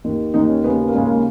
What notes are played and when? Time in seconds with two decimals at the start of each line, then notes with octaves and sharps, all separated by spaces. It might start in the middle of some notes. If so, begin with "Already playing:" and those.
0.04 D#2 D#3
0.34 D#2 D#3 D#4
0.49 C#4
0.64 D#2 C#3 B3
0.79 B3
0.88 A#3
0.94 D#2 C#3 G#3
1.05 A#3